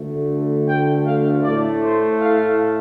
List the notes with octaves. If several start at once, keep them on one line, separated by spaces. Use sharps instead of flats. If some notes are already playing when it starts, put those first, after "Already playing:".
Already playing: D2 D3 A3
G5
F5
A2 A3 D5
C5
F5